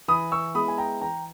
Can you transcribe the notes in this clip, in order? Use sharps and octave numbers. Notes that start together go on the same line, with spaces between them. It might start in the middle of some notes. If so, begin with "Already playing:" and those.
E3 B5 D#6
C#6 E6
G#3 B3 E4 B5 D#6
G#5
G5 A#5
E3 G5 A#5